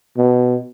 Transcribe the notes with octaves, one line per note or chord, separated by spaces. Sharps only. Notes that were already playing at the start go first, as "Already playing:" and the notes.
B2